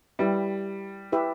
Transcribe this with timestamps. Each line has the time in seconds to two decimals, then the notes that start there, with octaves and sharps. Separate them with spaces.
0.19 G3 E4 G4 B4 E5
1.12 E4 G4 B4 E5